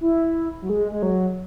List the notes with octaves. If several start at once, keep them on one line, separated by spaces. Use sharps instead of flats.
E4
F#3
G#3
G#3
F#3